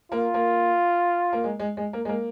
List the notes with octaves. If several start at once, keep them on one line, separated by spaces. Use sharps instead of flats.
A#3 F4
A#3
A#3
G#3
G#3
G#3
A#3
G#3
A#3